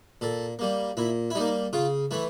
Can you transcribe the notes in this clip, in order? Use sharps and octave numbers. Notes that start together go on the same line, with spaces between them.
A#2 A4
G3 A#3
A#2 E4
E4
G3 A#3 D#4
C#3 F4
E3 A3 E4